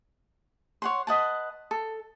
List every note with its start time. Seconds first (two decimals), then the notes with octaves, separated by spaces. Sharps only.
0.82 C#5 F#5 C6
1.07 B4 D#5 F#5 A5
1.71 A4